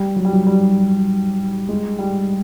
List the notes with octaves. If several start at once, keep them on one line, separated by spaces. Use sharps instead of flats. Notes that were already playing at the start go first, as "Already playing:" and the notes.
Already playing: G3
F#3
G3
F#3
G3
G#3
G3